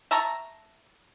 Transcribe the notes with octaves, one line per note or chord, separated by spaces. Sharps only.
E5 A5 A#5 C#6